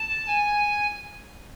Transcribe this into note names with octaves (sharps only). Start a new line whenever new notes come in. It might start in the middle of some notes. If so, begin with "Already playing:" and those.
Already playing: A5
G#5